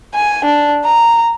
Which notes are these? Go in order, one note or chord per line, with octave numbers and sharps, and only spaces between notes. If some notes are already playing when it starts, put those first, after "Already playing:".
G#5
D4
A#5